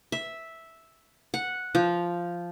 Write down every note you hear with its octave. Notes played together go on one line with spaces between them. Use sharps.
E5
F#5
F3